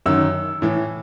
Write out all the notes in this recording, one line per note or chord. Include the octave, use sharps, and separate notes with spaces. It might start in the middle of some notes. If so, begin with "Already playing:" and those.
F#2 D#3 E6
A2 E3